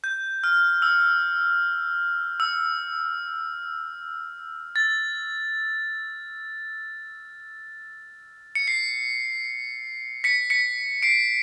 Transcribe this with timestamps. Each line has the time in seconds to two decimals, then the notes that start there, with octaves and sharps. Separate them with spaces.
0.04 G6
0.44 F6
0.82 E6
2.40 E6
4.76 A6
8.55 C#7
8.68 C7
10.24 B6 C#7
10.50 B6 C#7
11.02 C7 D7